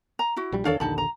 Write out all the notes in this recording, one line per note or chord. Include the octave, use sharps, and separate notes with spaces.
A#5
E4 F#4
A#1 G3
E2 D#3 D4 A4 C#5 F5
A#1 D#2 D3 D#4 A5 B5
A#5